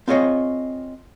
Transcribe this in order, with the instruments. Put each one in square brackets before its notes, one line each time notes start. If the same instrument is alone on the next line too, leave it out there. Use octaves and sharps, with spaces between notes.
[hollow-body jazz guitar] C4 F4 G#4 C#5 D#5